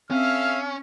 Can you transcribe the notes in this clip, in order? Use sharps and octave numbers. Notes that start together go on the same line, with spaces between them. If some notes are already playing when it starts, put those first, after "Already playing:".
C4 C#4 A4 E5 F5 F6